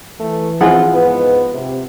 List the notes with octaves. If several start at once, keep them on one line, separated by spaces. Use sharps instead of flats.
E3 A3
F3 C4 E4 F4 G#4 F#5
G#2 B3 B4
C3